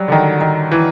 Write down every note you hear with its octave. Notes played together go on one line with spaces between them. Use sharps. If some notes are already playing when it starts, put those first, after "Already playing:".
Already playing: F#3 G3
D3
D#3
D#3
E3